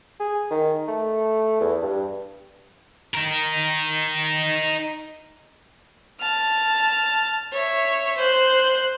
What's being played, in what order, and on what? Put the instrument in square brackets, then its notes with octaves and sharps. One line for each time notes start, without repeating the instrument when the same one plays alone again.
[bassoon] G#4
D#3
A3
E2
G2
[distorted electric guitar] D#4 A#4
[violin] A5 F6
C#5 E5
C5 F#6